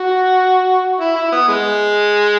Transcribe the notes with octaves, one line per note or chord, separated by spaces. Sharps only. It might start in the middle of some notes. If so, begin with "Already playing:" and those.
Already playing: F#4
E4
E4
B3
G#3